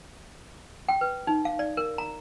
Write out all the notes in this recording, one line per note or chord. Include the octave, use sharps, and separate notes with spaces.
G5
B4
D#4
F5
D5
A#4
A#5